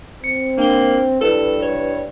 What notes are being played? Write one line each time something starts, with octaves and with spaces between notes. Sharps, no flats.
C4 C#7
A#3 D4 G5 G7
G2 E4 A4 B4 E7
C#5